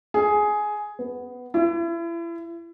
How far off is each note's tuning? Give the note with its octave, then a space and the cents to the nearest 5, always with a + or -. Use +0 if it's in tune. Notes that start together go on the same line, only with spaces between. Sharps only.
G#4 +10
B3 +10
E4 +35